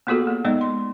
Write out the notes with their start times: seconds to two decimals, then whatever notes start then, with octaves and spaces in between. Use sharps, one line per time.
0.07 A#3 B3 F4 F#4 G#4 A4
0.27 A#3
0.45 G#3 B3 D#4 D5 D#5
0.61 C6